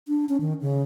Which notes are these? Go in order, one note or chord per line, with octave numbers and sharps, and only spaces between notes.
D4
C#4
D#3
C#3